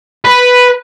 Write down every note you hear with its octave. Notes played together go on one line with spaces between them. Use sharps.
B4